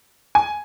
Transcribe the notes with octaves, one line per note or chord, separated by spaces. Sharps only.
G#5